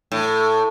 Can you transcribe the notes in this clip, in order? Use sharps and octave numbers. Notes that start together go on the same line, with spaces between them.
A2